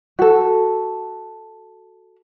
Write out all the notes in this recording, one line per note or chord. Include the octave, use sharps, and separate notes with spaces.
F#4 A4